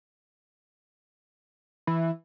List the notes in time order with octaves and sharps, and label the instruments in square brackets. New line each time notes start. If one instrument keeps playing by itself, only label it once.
[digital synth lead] E3